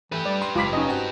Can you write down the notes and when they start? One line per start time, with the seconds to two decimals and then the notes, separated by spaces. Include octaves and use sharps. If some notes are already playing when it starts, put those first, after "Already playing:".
0.12 E3 A3 G4 B4
0.25 G3 D5
0.42 C6
0.56 F#1 G#3 F4 B5 D6 B6
0.73 C#4 D#4 D#5
0.87 C4 F#4